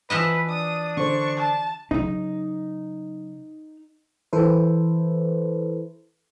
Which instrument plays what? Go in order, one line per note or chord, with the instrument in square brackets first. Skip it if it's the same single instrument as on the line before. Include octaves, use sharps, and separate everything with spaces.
[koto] E3 F3 D#5 [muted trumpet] B4
[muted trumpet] D4 [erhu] D#6
[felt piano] D3 C5 [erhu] C#6
[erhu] A5
[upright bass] C#3 F#3 [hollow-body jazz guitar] D#4
[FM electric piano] E3 E4 A4 B4 C5